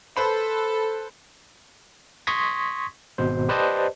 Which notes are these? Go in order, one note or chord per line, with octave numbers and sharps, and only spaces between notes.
A4 B4 C5 B5
C6 C#6 D#6 G#6 A#6 B6
G#1 B2 C5
G4 B4 C5 D5 D#5 A5